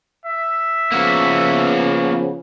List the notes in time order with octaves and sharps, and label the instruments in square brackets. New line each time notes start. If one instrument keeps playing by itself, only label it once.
[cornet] E5
[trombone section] C#3 F3 B3 [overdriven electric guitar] A#3 F#4